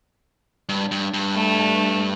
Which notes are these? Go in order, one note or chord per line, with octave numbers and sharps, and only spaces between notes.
G2
G2
G2
A3